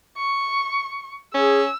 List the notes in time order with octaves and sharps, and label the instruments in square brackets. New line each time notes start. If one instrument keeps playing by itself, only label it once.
[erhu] C#6
[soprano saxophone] C#4 [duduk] G#4 [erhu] E6